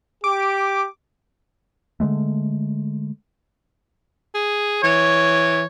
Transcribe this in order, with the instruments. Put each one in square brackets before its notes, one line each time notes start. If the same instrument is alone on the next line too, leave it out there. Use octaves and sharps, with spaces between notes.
[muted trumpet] G4 [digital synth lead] D6
[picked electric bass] D3 D#3 G#3 A3
[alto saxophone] G#4
[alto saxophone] E3 [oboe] C#5